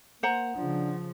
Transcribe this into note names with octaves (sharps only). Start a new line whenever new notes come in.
A#3 C5 F#5 A#5
C#3 F3 D4